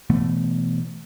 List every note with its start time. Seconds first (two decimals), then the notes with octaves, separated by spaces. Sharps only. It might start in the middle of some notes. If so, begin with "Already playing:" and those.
0.10 B2 E3 A3 B3